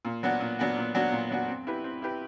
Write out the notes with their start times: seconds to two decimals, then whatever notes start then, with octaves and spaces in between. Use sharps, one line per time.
0.05 A#2
0.23 F#3 B3 D4 F#4
0.41 A#2
0.59 F#3 B3 D4 F#4
0.77 A#2
0.94 F#3 B3 D4 F#4
1.12 A#2
1.31 F#3 B3 D4 F#4
1.48 C4
1.67 E4 G4 B4
1.84 C4
2.02 E4 G4 B4